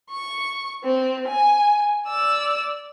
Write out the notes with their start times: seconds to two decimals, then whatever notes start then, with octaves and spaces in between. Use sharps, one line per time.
0.11 C#6
0.84 C4
1.28 G#5
2.08 D5 E6